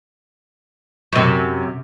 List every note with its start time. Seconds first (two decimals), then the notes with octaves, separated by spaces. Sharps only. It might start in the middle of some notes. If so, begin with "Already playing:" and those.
1.13 F#2 C3